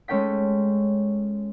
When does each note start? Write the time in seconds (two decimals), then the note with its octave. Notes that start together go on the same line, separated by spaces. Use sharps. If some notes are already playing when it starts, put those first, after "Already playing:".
0.08 G#3 A3 C#4 A4 G5 B6